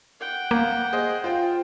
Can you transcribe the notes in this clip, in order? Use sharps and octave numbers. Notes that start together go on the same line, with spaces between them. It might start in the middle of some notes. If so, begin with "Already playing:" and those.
F#5 G5
A#3
G#4 C5 D#5
F4 C5 G5